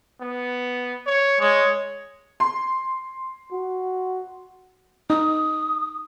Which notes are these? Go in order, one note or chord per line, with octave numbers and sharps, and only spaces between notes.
B3
C#5
G#3 C#5
C6
F#4
D#4 D#6